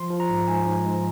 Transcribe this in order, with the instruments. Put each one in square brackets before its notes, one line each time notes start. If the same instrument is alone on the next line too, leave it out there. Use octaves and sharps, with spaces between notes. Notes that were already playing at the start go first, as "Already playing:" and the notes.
Already playing: [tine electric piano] F3 C6
F3
A#5
G#2
G#2 G#5
G#2
G#2